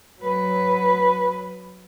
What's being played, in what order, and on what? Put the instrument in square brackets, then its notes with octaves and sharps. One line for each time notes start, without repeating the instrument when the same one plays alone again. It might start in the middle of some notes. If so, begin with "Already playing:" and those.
[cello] F#3 B4